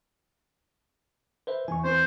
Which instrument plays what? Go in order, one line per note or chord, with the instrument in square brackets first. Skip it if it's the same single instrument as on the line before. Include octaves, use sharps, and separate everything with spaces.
[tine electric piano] B4 C5 E5
[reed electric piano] E2 E3 [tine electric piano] G#5 C#6
[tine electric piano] C4 B4 [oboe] C5